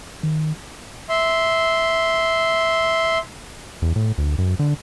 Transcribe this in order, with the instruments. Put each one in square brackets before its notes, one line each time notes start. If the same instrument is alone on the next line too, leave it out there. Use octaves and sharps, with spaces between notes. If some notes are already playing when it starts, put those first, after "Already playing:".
[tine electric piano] D#3
[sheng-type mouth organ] E5 C6
[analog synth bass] E2
A2
D2
F#2
D3